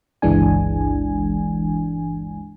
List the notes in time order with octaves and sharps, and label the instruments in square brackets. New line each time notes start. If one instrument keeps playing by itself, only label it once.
[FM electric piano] G1 C#2 E3 G#3 D4 G#5